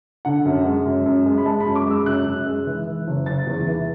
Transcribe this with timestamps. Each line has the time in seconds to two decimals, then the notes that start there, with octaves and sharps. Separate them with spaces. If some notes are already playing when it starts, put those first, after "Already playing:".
0.25 D3 F#5
0.45 F#2
0.65 G#3
0.86 F#2
1.06 F#2
1.26 G#3
1.38 B5
1.45 G#3 A5
1.60 B5
1.66 F#2
1.75 D6
1.86 G#3 E6
2.06 F#2 F#6
2.26 F#2
2.46 G#3
2.67 E3
2.86 E3
3.07 F#1
3.26 F#1 A6
3.47 E2
3.67 E3